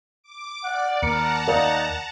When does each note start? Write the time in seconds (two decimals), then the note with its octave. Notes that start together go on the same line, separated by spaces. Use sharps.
0.23 D6
0.64 D5 F#5
1.03 D#2 A#4 F#5 A5 A#5 C#7
1.48 D#4 A#4 D5 F5